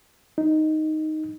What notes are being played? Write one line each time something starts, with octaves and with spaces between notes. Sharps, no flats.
D#4